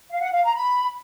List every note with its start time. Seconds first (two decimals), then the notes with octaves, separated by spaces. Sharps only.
0.11 F5
0.22 F#5
0.33 F5
0.44 A#5
0.55 B5